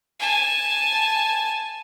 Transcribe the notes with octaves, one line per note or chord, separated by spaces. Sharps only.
G#5 A5